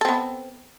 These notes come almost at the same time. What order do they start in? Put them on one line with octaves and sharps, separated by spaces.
A4 C4 B3